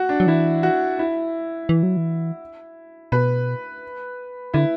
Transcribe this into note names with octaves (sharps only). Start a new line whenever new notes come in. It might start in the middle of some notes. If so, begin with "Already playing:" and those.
Already playing: F#4
D4
F#3
E3 E4
F#4
E4
E3
F#3
E3
B2 B4
D3 E4